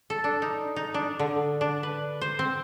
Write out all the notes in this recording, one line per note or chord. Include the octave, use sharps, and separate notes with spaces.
A4
D4
D#4
D#4
D4
D3
D4
B4
C5
C4